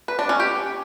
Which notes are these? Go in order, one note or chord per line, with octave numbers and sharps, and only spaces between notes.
B4
D4
C#4
G4